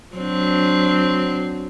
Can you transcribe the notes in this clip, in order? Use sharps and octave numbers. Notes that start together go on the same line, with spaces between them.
F#3 C4 D4